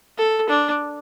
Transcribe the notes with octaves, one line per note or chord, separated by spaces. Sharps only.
A4
D4